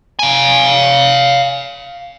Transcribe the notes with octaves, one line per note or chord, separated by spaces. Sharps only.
F5 G#5